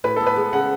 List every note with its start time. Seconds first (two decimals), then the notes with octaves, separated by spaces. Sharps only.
0.04 A2 B4
0.16 B3 A4
0.27 B4
0.36 G#3
0.53 C#3 F#5